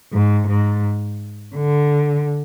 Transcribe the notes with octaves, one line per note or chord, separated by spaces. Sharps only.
G#2
G#2
D3